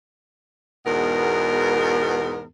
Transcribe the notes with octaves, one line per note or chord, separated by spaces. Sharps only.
E2 G#2 B2 B3 A#4